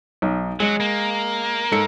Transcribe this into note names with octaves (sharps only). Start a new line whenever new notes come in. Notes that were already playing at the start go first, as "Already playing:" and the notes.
B1 D#4
F#3 G#3
A#3
G#2 A4 C#7